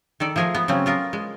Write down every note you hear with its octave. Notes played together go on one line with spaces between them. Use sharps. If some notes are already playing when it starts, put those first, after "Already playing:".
D#3 A4 D5
F3 A3 G#4 A#4 G#5
B3
C#3 F#3 C4 C#4
B3 F4 A#4
G#3